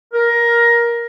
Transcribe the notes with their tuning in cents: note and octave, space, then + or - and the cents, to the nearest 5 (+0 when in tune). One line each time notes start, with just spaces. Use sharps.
A#4 +15